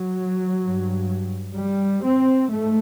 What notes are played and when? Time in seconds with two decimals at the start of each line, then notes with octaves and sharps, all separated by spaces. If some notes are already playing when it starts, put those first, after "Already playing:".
Already playing: F#3
0.61 G2
1.55 G3
2.03 C4
2.50 G#2 A3